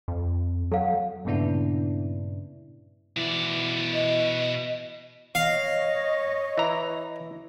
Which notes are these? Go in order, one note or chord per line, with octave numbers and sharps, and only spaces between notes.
F2
F#3 A4 F5 F#5
G2 A#2 C#3 B3 D4 E4
B2 E3 D5
D#5
C#5 D#5 F5
E3 A#5